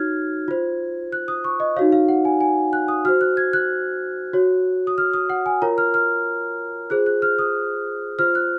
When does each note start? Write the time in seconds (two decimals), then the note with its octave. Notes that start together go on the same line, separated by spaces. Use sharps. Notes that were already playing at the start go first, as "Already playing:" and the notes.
Already playing: D#4 F#4 C#5 F6 G#6
0.48 F4 C5
1.12 F#6
1.28 D#6
1.44 C#6
1.60 D#5
1.76 D#4 F#4 C#5 F5
1.92 F5
2.08 F#5
2.25 G#5
2.41 G#5
2.73 F#6
2.88 D#6
3.05 F#4 C5 F6
3.21 F#6
3.37 G#6
3.53 F#6
4.33 F#4 C#5
4.87 D#6
4.98 F6
5.14 D#6
5.30 F#5
5.46 G#5
5.62 F4 A#4 C#5 A#5
5.78 F6
5.94 F6
6.90 F4 G#4 C5 F#6
7.06 F#6
7.22 F6
7.39 D#6
8.19 F4 C5 F6
8.35 F#6